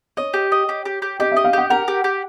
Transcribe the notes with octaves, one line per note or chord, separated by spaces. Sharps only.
C#5 D#5
G4
D#5
G4
G4
G4
G4 D#5
D#5 E5
F5
G4 F#5
A#4 F#5
G4
G4